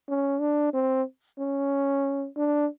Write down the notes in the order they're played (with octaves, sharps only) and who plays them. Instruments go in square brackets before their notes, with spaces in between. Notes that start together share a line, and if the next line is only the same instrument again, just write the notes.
[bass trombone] C#4
D4
C4
C#4
D4